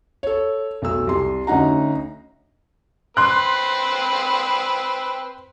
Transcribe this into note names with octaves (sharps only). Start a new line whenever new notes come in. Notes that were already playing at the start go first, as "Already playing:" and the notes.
A4 C#5
B1 A3 E6
C2 C6
D2 C#4 D#4 F#5 A#5
C4 B4 C6 F#6